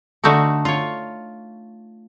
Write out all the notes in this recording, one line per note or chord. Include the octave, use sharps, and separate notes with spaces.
D3 A3 D#4 F#4 A4
F4 C#5